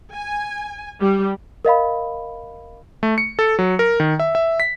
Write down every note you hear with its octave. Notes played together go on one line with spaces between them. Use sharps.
G#5
G3
A#4 D#5 F5 B5
A3
C#7
A4
F#3
A#4
D#3
E5
E5
B6